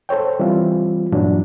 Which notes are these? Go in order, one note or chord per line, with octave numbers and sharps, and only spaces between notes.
A4 C5 C#5 G5
E3 G3 C4 F4
G2 A#2 E3 F#3 D4